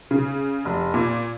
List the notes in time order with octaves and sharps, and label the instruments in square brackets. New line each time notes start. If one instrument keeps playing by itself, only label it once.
[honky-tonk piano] C#3
F1
A#2